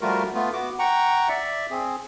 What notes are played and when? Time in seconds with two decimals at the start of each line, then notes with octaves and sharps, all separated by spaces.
0.01 F3 G3 A3 F4 F#4 A#4
0.34 A3 B3 F4
0.53 B3 F#4 D6
0.79 F#5 G5 A#5 C#6
1.29 D5 E5
1.71 C4 G#4